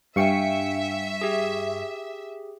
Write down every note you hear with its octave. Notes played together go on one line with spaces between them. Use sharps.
G2 E5 F5 G5 G#5 C#6 C#7
G4 G#4